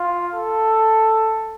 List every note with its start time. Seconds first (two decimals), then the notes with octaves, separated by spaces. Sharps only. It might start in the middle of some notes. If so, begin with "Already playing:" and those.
Already playing: F4
0.33 A4